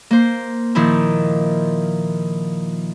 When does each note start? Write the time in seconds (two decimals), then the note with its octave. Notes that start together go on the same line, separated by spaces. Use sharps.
0.11 A#3 C5
0.75 A#2 D#3 F3 E4 F4